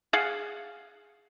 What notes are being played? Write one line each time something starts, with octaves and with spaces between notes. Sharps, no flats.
G#4 F5 F#5